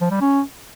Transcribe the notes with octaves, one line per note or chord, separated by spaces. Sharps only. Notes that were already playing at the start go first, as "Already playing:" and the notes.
F3
G3
C#4